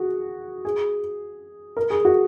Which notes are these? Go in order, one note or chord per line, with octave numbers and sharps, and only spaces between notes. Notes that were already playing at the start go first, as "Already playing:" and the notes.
Already playing: F#4 G#4
G#4
A#4
G#4
F#4